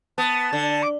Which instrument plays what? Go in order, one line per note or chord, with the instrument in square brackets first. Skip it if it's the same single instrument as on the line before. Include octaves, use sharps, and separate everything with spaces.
[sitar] B3 [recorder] A5
[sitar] D3
[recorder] D6